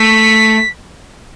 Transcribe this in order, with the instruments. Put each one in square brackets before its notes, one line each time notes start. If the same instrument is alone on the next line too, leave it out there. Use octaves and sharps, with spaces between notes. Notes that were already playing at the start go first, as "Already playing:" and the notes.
Already playing: [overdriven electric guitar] A3 [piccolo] B6